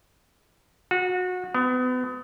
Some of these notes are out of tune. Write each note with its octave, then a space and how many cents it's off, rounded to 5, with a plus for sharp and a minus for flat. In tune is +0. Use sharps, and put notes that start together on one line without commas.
F#4 -25
B3 +35